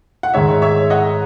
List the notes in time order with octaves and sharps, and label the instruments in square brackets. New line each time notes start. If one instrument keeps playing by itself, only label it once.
[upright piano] F#5
[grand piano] G#2 D#3 G#3 D#4 G#4 [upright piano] C#5 E5
[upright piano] C#5 E5
D#5 F#5